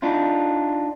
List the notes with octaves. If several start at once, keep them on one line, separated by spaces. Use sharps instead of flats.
D4 D#4 F4